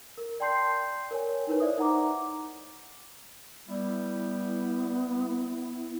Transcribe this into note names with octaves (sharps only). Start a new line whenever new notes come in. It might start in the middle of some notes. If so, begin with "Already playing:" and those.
A#4
D5 G5 A5 C6 G6 C7
A#4 C#5 G#5
D#4 E4 A#4 B4 C#5
C5 D5 E5 D#6
D#4 F#5 A#5 D6
G3 B3 E4